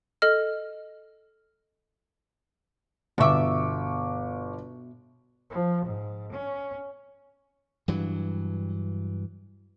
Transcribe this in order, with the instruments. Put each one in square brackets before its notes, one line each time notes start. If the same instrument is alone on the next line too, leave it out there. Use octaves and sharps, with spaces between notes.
[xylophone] A4 D#5 F6
[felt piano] G1 C#6 D6 [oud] B2 E5
[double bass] F3
G#2
C#4
[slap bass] G2 E3 F#3